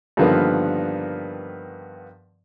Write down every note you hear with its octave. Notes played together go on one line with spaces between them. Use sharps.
G2 D3 D#3 F3 A#3 B3